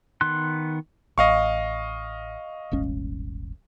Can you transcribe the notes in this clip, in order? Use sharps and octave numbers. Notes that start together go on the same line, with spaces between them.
D#3 B3 C6 F#6
A1 D#5 F5 C#6
D#1 G#1 C#4